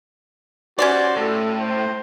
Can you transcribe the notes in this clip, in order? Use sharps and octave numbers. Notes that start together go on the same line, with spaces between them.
C#4 F#4 G4 C5 D5
A2 A4
C5